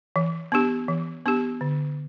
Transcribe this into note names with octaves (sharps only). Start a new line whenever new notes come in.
E3
B3 D4 G4
E3
B3 D4 G4
D3